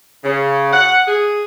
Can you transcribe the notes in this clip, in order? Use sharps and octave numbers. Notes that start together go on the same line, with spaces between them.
C#3
F#5
G#4